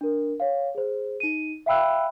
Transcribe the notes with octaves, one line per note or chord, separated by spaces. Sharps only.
D4 A#4
C#5 F5
G#4 C5
D#4 D#7
E5 F5 G5 B5 E6 F#6